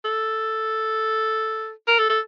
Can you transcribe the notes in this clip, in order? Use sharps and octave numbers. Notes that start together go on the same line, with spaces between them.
A4
A#4
A4
A4